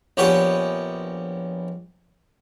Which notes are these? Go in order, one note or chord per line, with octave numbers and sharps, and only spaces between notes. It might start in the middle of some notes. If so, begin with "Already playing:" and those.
A#1 B3 C#4 G4 C#5 G#5